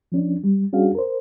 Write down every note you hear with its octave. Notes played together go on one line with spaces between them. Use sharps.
F3 C#4 D4
G3
G3 C#4 D4 F#4 G#4 F5
A#4 C5